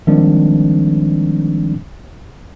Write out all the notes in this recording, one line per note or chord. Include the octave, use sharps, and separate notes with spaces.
D#3 F3 G3 G#3 C4 D4